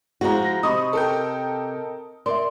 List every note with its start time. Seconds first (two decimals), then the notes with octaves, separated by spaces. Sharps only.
0.21 F3 G#3 E4 F#4 A#5
0.45 A#6
0.63 C3 D#4 D#5 B5 C#6 D#6
0.93 A4 A#4 G5
2.26 A#4 D5 E5 C6